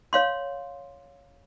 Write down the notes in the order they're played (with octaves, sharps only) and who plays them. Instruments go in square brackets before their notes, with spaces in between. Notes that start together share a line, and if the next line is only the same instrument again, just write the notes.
[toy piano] C#5 F5 C6